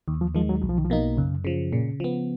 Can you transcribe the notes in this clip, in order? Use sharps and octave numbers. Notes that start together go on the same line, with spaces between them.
D#2 D#3
F3
D#3 F3 G#3
F#3
B1 F#3
F3
D#3
F3
B2 A#3 D#4
F#2 C#3
C#3 F3
A#2 C#3
F3 B3